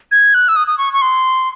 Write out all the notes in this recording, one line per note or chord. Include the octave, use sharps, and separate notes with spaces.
G#6
F#6
E6
D#6
D#6
C#6
C#6
C6